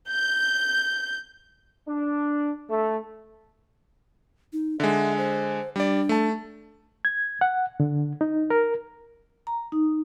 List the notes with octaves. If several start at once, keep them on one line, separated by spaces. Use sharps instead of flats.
G6
D4
A3
D#4
D3 G#3 E5
C5
G3 D4 D5
A3 A5
G#6
F#5
D3
D#4
A#4
A#5
D#4